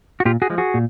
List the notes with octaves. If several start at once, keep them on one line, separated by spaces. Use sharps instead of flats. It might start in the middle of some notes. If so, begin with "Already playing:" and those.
F#4
A#2 F4 G4
F#4 G#4
F3 G#3
F#4 G#4
A#2